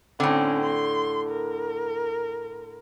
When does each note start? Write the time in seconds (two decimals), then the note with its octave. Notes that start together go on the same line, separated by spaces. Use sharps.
0.20 A2 D3 C4 C#4
0.64 C6
1.29 A#4